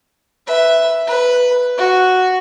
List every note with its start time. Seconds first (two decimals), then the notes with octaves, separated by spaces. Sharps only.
0.47 B4 E5
1.07 B4
1.78 F#4